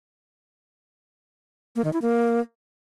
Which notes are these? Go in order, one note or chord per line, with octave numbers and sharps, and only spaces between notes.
A#3
D#3
E4
A#3